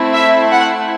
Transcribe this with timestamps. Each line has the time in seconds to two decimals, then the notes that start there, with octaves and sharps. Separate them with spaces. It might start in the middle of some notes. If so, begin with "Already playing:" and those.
Already playing: A3 C4 E4
0.13 E5
0.51 F#5